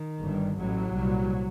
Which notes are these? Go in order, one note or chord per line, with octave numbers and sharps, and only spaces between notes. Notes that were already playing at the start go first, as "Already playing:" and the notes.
Already playing: D#3
G1 G2
A1 A2 F#3
C2 A#2